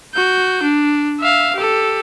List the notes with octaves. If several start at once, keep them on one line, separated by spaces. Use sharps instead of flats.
F#4 G6
D4
E5 F5
G4 A4